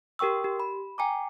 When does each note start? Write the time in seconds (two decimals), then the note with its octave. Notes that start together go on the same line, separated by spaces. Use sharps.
0.19 G4 A#4 G5 C#6 E6
0.44 G4
0.60 B5
0.98 G5 G#5 A#5 D6